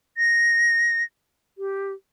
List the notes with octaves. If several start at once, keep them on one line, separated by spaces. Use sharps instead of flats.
A#6
G4